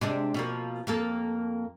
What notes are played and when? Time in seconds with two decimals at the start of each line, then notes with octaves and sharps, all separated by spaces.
0.01 C3 G#3 D4
0.34 B2 F3 A#3
0.87 F2 A#3 A4